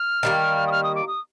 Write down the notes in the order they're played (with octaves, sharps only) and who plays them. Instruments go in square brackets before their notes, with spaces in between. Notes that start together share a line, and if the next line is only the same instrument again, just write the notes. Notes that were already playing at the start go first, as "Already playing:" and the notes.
Already playing: [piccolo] F6
[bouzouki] D#3 G3 A#3
[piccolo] D#6
F6
D#6
D6
D#6